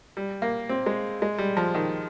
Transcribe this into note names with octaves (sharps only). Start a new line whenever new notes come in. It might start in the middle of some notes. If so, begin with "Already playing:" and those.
G3
A#3
C4
G#3
G#3
G3
F3
D#3